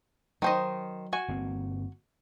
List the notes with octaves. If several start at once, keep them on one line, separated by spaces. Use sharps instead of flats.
D#3 F#3 C5 D#5
F#4 G#5
G1 A#3 C4